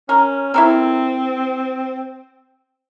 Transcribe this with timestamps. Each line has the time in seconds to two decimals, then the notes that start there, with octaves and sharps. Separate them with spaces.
0.09 C#4 A#4
0.54 C4 E4 A4 A#4